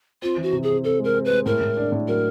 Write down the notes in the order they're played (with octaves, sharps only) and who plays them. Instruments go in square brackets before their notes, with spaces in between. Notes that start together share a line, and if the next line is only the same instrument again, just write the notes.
[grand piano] C4 [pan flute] F4
[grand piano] E3
[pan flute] F#4
[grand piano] C3
[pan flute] G#4
[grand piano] C4
[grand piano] C4 [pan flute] A4
[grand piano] G#3 [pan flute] A#4
[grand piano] C4
[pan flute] B4
[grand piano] G#3
[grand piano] A2 [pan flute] A#4
[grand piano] A2
D4
A2
[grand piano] F#3 [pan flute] A#4